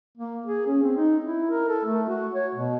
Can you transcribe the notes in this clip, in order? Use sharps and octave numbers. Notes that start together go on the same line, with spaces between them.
A#3
G#4
C#4
C4
D#4
E4
A#4
A4
A3
F#4
C#5
B2